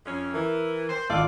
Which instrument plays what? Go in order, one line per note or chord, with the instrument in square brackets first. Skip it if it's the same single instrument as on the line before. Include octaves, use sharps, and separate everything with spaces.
[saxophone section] F2 C#4
[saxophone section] E3 [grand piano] A#4
[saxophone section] C5
[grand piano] G#1 F4 A4 [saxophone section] D5